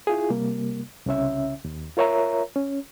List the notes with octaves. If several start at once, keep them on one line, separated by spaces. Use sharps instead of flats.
E4 F4 G#4
C3 G3 A#3
C2 C#3 C#4 E5
D#2
F4 A#4 C#5 E5 A#5
C#4